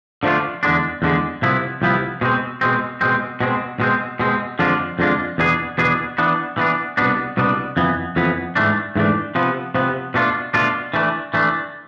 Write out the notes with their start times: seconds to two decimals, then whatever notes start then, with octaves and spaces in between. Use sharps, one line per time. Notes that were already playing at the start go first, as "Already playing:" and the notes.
0.23 D3 F3 A3 D4 F4
0.63 E2 D3 G#3 D4
1.02 E2 D3 G#3 D4
1.42 C2 C3 F3 B3 E4
1.82 C2 C3 F3 B3 E4
2.21 B2 G#3 C4
2.61 B2 G#3 C4
3.01 B2 G#3 C4
3.41 B2 G#3 C4
3.80 B2 G#3 C4
4.20 B2 G#3 C4
4.59 F2 D3 G#3 D4 F4
4.99 F2 D3 G#3 D4 F4
5.38 E2 B2 B3 D4 G#4
5.78 E2 B2 B3 D4 G#4
6.18 E3 B3 D4
6.58 E3 B3 D4
6.97 C2 B2 B3 D4
7.37 C2 B2 B3 D4
7.77 F2 E3 B3
8.16 F2 E3 B3
8.56 G#2 E3 A3 D4
8.96 G#2 E3 A3 D4
9.35 C3 F3 B3
9.75 C3 F3 B3
10.14 B2 A3 D4 F4
10.54 B2 A3 D4 F4
10.94 E3 A3 D4
11.34 E3 A3 D4